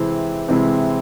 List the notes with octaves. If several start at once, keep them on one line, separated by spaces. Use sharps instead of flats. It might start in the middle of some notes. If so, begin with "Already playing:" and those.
Already playing: C3 E3 G#3 C4 E4
C3 E3 G#3 C4 E4